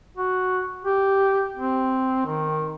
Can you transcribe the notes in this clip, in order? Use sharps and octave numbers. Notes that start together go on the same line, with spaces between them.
F#4
G4
C4
D#3